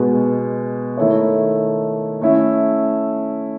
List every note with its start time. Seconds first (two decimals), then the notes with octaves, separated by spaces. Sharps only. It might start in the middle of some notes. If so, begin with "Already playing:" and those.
Already playing: B2 G#3 B3
0.97 D#3 A3 E4 A4 C#5
2.21 A3 C#4 E4